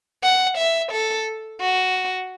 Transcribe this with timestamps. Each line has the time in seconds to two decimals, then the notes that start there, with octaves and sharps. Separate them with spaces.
0.23 F#5
0.57 E5
0.92 A4
1.61 F#4